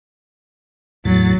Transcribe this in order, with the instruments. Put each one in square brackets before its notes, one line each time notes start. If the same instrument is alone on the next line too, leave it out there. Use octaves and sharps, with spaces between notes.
[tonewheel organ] E2 A2 A6 [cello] F#3